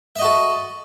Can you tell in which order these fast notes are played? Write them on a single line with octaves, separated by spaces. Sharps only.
E5 D#5 F#4 A4